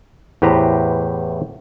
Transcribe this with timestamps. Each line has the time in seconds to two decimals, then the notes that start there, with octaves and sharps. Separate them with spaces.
0.42 E2 A2 G4 B4 C5 A#5